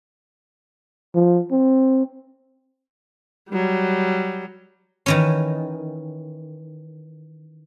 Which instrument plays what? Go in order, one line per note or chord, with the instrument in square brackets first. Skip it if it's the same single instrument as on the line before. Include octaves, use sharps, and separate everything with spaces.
[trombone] F3
C4
[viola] F#3 G3
[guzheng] D#3 E3 C#4